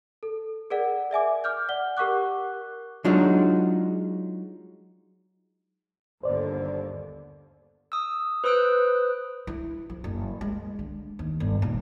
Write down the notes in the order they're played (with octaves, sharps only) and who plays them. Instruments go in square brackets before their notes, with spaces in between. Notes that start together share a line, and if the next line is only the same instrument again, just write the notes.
[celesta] A4
G#4 A#4 D5 F#5
D5 E5 G#5 D6
D6 F6 G6
D5 F#5 G7
G4 A#4 F#5 C#6 D6 F#6
[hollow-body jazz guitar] F#3 G#3 D4 D#4 F4 F#4
[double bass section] G1 D#2 D3 [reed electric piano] C5 D5
[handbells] D#6 E6
B4 C5 D#6 E6 F#6 D7
[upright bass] E4
F3
F#1
G#3
D3
D#2
G1
D#1